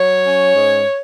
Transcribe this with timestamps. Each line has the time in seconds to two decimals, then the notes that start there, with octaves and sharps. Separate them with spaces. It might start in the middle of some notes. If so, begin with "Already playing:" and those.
Already playing: F#3 C#5
0.25 C#4
0.55 G#2